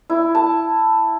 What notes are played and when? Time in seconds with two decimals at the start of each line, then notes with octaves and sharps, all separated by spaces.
0.10 E4
0.35 A5